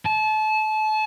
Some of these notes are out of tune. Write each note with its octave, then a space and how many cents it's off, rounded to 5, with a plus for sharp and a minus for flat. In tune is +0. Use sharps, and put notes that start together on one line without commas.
A5 -30